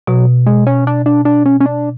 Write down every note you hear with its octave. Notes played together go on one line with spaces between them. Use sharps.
B2 F#3
G#3
C#4
D4
D4
D4
C#4
C#4
D4